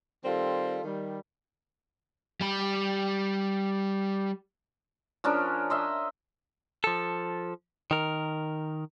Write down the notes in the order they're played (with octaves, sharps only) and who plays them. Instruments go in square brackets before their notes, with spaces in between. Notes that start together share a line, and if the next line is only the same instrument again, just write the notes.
[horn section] D#3 G3 C4 F4 A4
D#3 G3
[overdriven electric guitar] G3 B5
[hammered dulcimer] F3 C#4 D4 A#4
C5 D#5 E5
[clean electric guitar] F3 A4
D#3 A#4